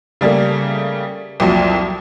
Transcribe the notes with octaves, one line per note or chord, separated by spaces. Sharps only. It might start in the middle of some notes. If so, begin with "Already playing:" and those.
C#3 G3 A3 A#3
C2 F2 A#2 F#3